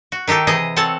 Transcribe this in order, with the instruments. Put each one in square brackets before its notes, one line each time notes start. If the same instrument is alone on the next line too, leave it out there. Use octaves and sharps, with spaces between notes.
[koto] F#4
D#3 D#4 G4 A4 G5
C3 E3 G#4 D#5
C4 A4 C#5 F#5 A5